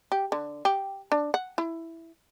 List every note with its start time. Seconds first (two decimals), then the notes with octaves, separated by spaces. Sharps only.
0.12 G4
0.32 D3
0.65 G4
1.12 D4
1.34 F#5
1.58 E4